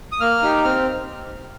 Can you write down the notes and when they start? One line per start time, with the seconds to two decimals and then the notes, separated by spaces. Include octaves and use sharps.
0.12 D#6
0.21 A#3 F6
0.42 D#4 G4
0.64 C4 F6